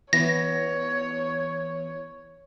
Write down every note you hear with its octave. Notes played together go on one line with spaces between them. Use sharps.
E3 B3 C#5 A#6